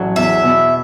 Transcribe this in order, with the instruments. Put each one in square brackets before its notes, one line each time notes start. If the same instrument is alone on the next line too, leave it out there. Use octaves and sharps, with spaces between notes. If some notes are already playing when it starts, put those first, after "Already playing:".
Already playing: [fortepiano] A1 F#3
[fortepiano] E2 [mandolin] E5
[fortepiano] B2